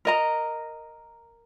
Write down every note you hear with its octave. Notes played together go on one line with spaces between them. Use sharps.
A#4 D#5 A#5